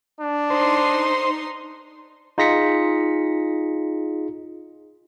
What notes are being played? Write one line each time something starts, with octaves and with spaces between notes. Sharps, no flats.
D4
D#4 C5 C6
D#4 F4 G#4 A#6 B6 C#7